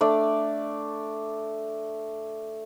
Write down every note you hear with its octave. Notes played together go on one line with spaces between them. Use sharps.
A3 D4 D5